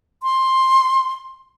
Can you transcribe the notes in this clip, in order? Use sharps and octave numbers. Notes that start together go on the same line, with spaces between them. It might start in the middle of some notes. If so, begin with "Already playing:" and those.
C6